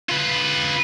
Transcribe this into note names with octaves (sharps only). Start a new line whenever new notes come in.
F4 B4